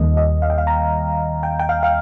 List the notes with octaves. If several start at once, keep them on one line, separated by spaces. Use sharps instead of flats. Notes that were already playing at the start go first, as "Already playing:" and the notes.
Already playing: D#2 D#3 G3 A#3 D#5
D#5
F5
G5
F5
A#5
G5
G5
F5
F5